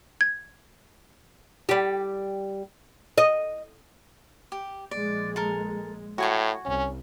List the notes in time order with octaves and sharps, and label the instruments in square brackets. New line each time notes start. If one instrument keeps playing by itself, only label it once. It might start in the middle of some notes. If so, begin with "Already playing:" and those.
[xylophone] G#6
[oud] G3 G4
D#5
[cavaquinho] G4
[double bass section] A#1 G#3 [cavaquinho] D5
[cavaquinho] A4 A#4
[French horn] A2 [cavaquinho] F#4 G#5 C#6
[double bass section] C2 [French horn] C#4